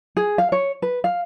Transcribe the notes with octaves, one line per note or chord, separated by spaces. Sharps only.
G#4
F5
C#5
B4
F5